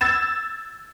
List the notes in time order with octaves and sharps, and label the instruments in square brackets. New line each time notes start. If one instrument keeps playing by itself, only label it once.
[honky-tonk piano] E6 G#6 A6 E7